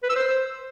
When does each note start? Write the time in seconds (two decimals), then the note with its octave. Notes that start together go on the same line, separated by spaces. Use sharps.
0.03 B4
0.10 E6
0.16 C5